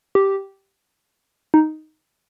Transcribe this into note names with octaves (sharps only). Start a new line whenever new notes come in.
G4
D#4